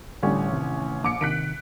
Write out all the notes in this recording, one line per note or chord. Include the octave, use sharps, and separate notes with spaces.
A1 D3 G3 C#4
C3 D#3
A#1 D6 C#7
C3 D#3 F#6 B6 D7